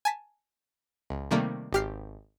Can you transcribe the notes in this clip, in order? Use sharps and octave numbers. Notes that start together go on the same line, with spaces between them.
G#5 A5 B6
C#2
C3 D#3 G3 A3 A#3
G#1 G4 F6 C7